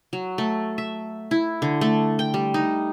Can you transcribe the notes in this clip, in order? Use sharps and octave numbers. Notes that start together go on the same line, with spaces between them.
F#3
A3
E5
E4
D3
A3
G5
G3
D#4